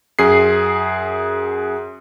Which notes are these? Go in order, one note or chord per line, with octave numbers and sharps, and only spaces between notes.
F#2 G#4 C7